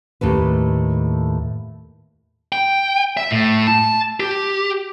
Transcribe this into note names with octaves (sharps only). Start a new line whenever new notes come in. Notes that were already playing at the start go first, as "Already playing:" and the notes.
D#2 A2 A3 B4
G5
E5
A2
A5
G4